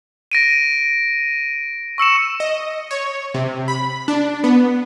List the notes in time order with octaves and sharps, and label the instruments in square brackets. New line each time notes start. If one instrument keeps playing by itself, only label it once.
[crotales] A#6 D7 D#7
C#6 E6 C#7 E7
[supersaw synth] D#5
C#5
C3
B5
D4
B3